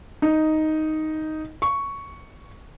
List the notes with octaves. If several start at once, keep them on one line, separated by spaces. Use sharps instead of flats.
D#4
C#6